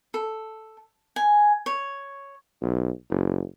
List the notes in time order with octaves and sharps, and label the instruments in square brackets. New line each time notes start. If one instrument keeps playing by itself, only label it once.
[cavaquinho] A4
G#5
C#5
[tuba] B1
F#1